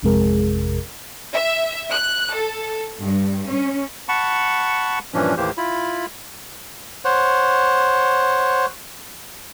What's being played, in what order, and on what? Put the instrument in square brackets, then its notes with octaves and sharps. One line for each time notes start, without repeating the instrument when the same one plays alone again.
[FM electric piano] A1 F2 C3 G#3 G#4 A#4
[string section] E5
F#6
A4
G2
C#4
[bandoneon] F#5 A5 B5 C#6
G2 A#2 E3 F3 C#4 D4
D#2 A2 E3 A#3 G4 C5
E4 F4 B5
[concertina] C5 C#5 F#5